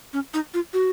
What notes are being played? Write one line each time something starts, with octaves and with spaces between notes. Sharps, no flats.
C#4
D#4
F4
F#4